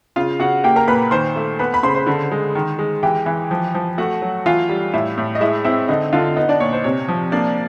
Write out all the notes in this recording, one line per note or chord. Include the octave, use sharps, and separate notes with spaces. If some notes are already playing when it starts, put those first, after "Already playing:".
C#3 F4 F5
C#3 F#4 F#5
A#3 G4 G5
A#4 A#5
A#2 B4 B5
D#3 C5 C6
A3
B3 B4 B5
B5
C#3 C5 C6
C5 C6
D3
G#3
D#3
G#3
E3 G4 G5
E3
F3
F3
A3 F#4 F#5
F#3
E3 F4 F5
G3
A2 E4 E5
A2
D#5
G#3 E4 E5
C4 E4 E5
D3 D#4 D#5
D3 F4 F5
B3 D#4 D#5
D4 D5
A#2 C#5
C5
C3 C#5
F3
A#3 D4 D5